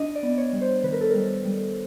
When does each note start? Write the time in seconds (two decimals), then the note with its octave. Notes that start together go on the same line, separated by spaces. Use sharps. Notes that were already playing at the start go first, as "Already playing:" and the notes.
Already playing: D4 D#5
0.15 D5
0.23 B3
0.38 C#5
0.53 G3
0.61 C5
0.84 D#3 B4
0.93 A#4
1.01 A4
1.10 G3 A#4
1.45 G3